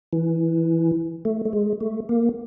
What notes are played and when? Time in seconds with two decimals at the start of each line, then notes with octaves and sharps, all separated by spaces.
0.13 E3
1.25 A3
1.45 A3
1.53 G#3
1.81 A3
2.09 A#3